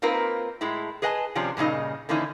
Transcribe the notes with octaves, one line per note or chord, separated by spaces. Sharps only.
A#3 C4 D#4 F4 A#4 B4
A2 G#3 E4
G#4 B4 D#5 F#5 G#5 A5
C3 F3 C#4 D4
G2 A#2 C#3 D#4 D#5
D3 E3 A#3 C#4 D#4 E4